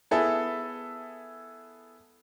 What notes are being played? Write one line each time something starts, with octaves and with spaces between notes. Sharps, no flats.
B3 E4 G#4 A4 E5